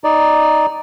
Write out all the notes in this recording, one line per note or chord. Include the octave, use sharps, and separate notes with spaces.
D#4 D5